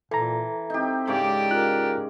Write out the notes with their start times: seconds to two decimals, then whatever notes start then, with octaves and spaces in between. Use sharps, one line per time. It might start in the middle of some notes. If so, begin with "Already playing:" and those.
0.11 A#2 E3 A4 A#5
0.70 C4 D#4 G4
1.07 G#2 C#3 C#4 G4 D5
1.51 F4 A#4 F#6